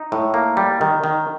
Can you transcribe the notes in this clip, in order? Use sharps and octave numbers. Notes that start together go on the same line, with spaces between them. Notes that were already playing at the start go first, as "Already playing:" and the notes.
Already playing: D#4
A2
A#3
G3
D#3
D#3